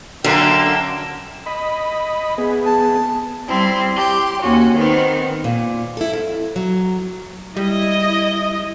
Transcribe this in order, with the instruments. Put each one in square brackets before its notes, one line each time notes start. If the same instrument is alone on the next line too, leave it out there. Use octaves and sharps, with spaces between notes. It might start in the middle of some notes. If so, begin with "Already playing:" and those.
[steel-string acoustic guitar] F#2 [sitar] D3 A#3 [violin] G5 E7
[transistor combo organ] D#5 B5
B3 G#4
[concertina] A5
[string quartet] G3 C4 E4
G4 C6
D#2 C#4 F#4
D#3 B3 C4
[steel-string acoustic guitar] A#2
E4 A4
F2
F#3
[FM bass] G3 [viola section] E4 D#5